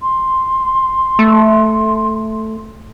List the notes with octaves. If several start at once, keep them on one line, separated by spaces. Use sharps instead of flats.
C6
A3